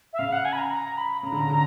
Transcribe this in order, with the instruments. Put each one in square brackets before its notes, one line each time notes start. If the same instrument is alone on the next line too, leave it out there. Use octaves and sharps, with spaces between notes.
[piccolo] E5
[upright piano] C#3 [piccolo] F5
[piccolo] F#5
G#5
B5
A#5
A#5
B5
[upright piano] C#3 [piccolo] A#5
[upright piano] D3
C#3
D3